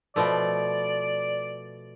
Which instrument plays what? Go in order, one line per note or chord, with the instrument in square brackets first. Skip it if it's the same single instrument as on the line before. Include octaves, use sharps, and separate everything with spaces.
[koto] B2 F3 A3 [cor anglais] D5